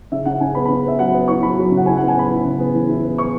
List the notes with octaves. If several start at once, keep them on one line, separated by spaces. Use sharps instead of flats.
C#3 E5
C#3 F#5
C#3 G#5
B3 B5
B5
C#3
B3 E5
F#3 F#5
B3
E4 C#6
F#3 B5
F#3
C#3
F#5
E4 G#5
F#5
B3
G#5
B3 B5
E4
C#3
B3
E3
E4
B3
B3 C#6